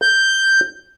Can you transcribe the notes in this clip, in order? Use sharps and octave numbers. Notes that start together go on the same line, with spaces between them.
G6